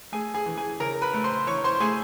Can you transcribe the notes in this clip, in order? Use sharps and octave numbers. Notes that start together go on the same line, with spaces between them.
A3 G#4 G#5
G#4 G#5
E3
G#4 G#5
C#3 A#4 A#5
B4 B5
A3
C5 C6
E3 C#5 C#6
C5 C6
A3 G#4 G#5